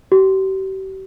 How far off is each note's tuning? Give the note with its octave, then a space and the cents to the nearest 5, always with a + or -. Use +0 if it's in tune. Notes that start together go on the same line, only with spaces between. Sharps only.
G4 -40